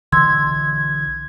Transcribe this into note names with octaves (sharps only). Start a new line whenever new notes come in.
B1 D3 E3 C6 E6 G#6